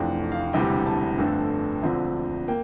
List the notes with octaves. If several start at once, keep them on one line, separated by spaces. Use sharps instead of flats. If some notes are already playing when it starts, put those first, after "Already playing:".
Already playing: F1 F2 E3 A3 D4
F5
E1 D2 C3 E3 G3 G5
A5
G1 F2 D3 A3 D4
E1 D2 D3 F3 C4
A#3 G5